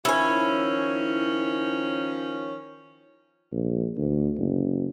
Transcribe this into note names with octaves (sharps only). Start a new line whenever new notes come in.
D#3 F3 C#4 E4 G#5
A#1
D2
F#1